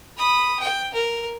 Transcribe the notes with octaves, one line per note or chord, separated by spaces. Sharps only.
B5 D#6
G5
A#4